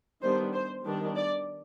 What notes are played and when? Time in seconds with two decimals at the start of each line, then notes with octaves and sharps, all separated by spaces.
0.22 D#3 G3 B3 D4 C5
0.54 C5
0.85 D#3 G3 B3 D4
1.16 D5